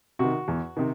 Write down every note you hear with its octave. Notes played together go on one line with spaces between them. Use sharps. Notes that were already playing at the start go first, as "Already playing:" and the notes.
C3 D#3 F#4
E2
C3 D#3